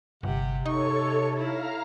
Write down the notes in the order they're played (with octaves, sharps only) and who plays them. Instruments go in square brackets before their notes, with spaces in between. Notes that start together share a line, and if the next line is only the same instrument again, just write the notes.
[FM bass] G1 [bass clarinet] C3 [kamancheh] G4 F#5
[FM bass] D#4 [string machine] A4 C#5 [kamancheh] C#6
[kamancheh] E4 [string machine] F5 A#5 F6